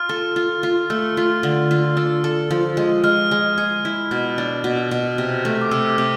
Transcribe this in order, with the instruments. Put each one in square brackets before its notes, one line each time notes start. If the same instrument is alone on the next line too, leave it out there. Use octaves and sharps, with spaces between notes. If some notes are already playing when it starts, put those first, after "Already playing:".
Already playing: [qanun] F4 [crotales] F6
[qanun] A4
F4
F4
[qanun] A3 [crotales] E6
[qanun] F4
D3
F4
[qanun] D4 [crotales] E6
[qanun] A4
F3
G#3
[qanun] G#3 [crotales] F6
[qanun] G#3
G#4
E4
[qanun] B2 [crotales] F6
[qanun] D4
B2
B2
C3
A3
[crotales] D6
[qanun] C3 [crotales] E6
[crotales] D6
[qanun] C3